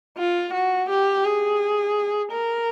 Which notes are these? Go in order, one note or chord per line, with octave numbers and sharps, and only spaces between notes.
F4
F#4
G4
G#4
A#4